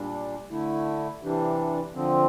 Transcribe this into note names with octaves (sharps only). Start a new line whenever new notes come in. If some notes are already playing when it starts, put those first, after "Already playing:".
Already playing: A#2 G3 D4
D3 A3 E4
C3 E3 G3 D4
D3 F3 C4